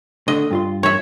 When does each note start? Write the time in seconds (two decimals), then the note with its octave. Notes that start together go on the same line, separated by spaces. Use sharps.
0.28 D3 A3 D#5
0.51 G2 F4 C6
0.83 C#5 E5